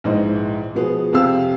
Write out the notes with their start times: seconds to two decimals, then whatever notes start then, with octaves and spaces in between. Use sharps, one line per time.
0.04 A#1 G#2 E3 D#5
0.75 B2 F3 B3 G#4
1.13 F2 C3 G4 F5 E6